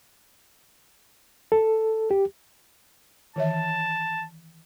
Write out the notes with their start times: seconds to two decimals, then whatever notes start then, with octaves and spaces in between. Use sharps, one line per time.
1.52 A4
2.11 G4
3.36 D#3 E3 E5 A5